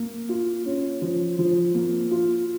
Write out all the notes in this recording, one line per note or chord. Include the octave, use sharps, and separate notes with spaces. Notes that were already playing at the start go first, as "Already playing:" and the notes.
Already playing: A#3
F4
C#4
F3
F3
A#3
F4